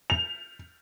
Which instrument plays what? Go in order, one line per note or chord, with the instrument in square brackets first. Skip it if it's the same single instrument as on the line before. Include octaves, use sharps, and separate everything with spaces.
[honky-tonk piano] F7